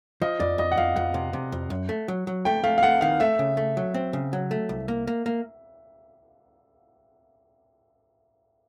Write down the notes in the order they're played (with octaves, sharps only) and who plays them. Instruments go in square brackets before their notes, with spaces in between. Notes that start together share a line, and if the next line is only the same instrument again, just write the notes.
[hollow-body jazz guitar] F3 [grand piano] D#5
[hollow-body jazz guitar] F2 [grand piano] D5
[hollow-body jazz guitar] F2 [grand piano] D#5
[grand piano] F#5
[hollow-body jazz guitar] F2 [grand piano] F5
[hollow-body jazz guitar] F2 [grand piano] F#5
[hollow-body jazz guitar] C3
C3
F2
F#2
A3
F#3
F#3
[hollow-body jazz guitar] A3 [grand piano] G5
[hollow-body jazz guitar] A3 [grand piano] F5
[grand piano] F5
[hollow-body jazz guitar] A3 [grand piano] F#5
[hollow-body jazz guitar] D#3 [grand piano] F5
[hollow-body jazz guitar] A3 [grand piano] E5
[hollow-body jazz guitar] C#3
A3
F#3
C4
C#3
F#3
A3
C2
A#3
A#3
A#3